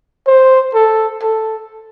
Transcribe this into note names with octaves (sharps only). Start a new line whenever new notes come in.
C5
A4
A4